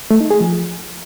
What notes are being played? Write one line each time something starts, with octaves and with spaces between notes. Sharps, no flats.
A3
D#4
G#4
F3